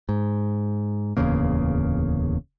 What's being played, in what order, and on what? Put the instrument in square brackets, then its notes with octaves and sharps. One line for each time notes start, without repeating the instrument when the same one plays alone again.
[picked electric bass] G#2
D1 E2 C#3 A#3